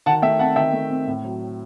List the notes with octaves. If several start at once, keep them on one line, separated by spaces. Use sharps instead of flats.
D#3 F#5 A5
A3 E5 G5
C4 F#5 A5
D#3 E5 G5
A3
C4
A2
F#3